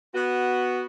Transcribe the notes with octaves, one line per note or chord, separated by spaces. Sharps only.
B3 F#4